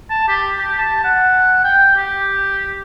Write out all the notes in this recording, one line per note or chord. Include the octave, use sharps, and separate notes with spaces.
A5
G4
G4
A5
F#5
G5
G4